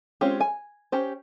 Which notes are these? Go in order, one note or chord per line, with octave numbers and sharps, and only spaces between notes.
G#3 C4 C#4 F4 G4
G#5
C#4 G4 C5